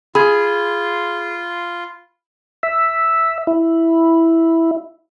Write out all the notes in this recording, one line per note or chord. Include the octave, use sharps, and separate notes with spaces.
F4 G#4 B5 G#6
E5
E4